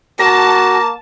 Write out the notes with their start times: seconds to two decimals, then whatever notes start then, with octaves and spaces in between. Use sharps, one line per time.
0.19 A#3 F#4 A5 A#6